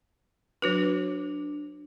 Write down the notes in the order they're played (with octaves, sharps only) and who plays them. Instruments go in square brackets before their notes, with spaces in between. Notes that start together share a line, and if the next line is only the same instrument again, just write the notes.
[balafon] F#3 F#4 B4 [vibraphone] D4